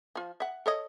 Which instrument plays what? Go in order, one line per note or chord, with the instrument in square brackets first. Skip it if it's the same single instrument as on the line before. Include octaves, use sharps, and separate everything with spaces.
[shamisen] F3 F4
E5 F#5
A4 C#5 D#5